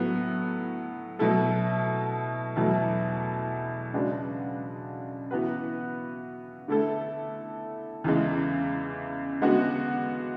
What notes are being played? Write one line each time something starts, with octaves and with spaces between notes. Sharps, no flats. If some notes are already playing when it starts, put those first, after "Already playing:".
Already playing: A2 F#3 B3
B2 F#3 A3 E4 A4
E2 B2 F#3 A3 E4
C#3 G#3 D4 F#4 B4
E3 B3 F#4 B4
D3 A3 E4 A4
E2 C#3 E3 G#3
D3 G#3 B3 F#4